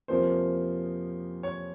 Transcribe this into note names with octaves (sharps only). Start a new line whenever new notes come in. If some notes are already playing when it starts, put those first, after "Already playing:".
F2 C3 F3 A#3 C#4 C5
C#5